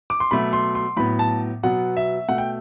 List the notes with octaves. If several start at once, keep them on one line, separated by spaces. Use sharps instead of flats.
D6
C6
B2 F#3 A3 B5
C6
C6
A2 F#3 B3 B5
A5
B2 F#3 B3 F#5
E5
B2 A3 F#5
G5